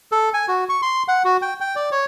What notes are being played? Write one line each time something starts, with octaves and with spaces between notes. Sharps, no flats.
A4
G#5
F#4
C#6
C6
F#5
F#4
G5
G5
D5
C#5